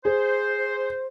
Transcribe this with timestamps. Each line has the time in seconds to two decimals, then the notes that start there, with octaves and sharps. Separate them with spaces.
0.05 G#4 C5